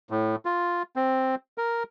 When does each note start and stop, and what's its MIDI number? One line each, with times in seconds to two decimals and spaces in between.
0.10 0.36 45
0.45 0.83 65
0.96 1.35 60
1.58 1.83 70